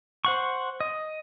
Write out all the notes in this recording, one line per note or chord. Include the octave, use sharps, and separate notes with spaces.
C5 F#5 C#6
D#5